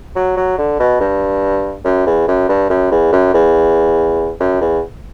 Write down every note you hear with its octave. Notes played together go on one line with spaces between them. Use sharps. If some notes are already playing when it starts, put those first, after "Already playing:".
F#3
F#3
D3
B2
G2
F#2
E2
F#2
G2
F#2
E2
F#2
E2
F#2
E2